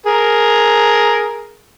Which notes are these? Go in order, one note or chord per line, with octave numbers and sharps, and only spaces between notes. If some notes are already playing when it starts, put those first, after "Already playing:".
G#4 A#4